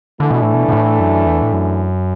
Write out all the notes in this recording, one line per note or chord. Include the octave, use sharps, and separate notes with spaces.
D3 E3 A3 D4
B2
A2
B2
B2
A2
F#2
E2
A2
F#2